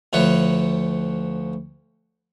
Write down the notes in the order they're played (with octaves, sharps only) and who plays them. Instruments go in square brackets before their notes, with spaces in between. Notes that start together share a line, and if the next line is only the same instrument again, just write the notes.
[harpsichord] D2 F3 B4 C#5